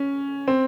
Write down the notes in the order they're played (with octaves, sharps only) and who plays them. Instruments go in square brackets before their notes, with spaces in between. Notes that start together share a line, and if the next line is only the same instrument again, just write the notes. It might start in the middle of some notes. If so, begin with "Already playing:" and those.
Already playing: [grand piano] C#4
C4